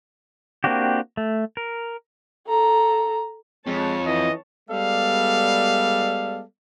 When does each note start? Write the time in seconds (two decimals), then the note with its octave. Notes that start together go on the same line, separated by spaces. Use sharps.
0.64 A#3 C4 D4 F#4 G4
1.17 A3
1.57 A#4
2.48 A4 A#5
3.67 F2 G#3 C#5 A5
4.07 E3 D#5
4.70 G3 G#3 B3 A4 D5 F5